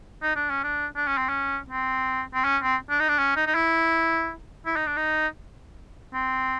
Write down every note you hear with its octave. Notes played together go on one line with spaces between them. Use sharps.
D#4
D4
C#4
D4
D4
C#4
C4
C#4
C4
C4
C#4
C4
D4
D#4
D4
C#4
D#4
D#4
E4
E4
D#4
D4
D#4
C4